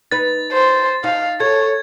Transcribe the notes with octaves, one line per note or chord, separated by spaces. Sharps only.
D#4 B4 A6
C5
D#4 F5
A4 C#5 G#6